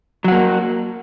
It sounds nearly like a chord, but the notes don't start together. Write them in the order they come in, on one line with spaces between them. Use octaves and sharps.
F#3 F#4 A#3